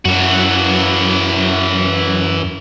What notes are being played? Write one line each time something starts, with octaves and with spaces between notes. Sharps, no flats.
F#2 E3 F#4